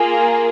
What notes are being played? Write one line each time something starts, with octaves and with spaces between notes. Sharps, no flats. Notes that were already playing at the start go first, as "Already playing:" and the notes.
Already playing: A#3 F4 G#4